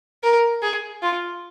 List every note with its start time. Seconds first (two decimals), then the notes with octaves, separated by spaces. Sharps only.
0.23 A#4
0.62 G#4
1.02 F4